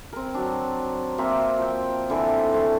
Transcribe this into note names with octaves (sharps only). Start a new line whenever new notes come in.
C4 A#4
F#3 D4
A#3 C4 E5 A#5
F3 G5
D3 E3 C4
A3 C5